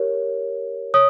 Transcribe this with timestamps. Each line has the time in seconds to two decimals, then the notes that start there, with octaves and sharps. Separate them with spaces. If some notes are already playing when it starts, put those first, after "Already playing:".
Already playing: G4 A#4 C#5
0.94 C#5 D#6